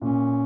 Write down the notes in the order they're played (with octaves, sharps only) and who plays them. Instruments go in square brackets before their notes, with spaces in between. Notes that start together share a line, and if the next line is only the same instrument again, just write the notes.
[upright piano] A#2 [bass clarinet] C#4